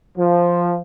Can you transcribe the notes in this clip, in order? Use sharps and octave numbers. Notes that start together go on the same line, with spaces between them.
F3